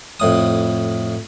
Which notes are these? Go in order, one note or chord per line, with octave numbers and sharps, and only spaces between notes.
F2 A2 D#6